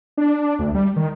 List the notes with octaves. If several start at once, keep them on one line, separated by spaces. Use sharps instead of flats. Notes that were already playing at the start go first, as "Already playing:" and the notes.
D4
D2
G3
D#3